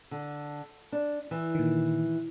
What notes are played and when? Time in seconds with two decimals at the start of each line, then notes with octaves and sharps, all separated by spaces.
0.11 D3
0.92 D4
1.31 E3
1.55 A#2 D#3